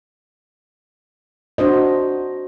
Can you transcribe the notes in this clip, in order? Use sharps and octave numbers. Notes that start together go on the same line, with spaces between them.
D4 F#4 C5 D#5